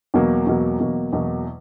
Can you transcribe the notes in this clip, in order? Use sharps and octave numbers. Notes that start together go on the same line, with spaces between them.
E2 B2 F#3 A#3
E2 B2 F#3 A#3
E2 B2 F#3 A#3
E2 B2 F#3 A#3